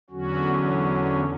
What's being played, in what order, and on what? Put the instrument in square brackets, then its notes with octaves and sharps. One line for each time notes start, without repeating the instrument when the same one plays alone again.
[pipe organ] E2 D3 F#3 C#4 F#4